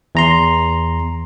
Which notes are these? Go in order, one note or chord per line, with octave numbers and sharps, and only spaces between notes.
E2 A#5 C6